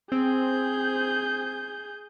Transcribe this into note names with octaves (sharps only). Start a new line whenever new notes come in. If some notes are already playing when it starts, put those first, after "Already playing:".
C4 G#4 G6